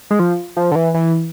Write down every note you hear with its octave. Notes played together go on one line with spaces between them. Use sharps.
G#3
F3
F3
D3
E3
E3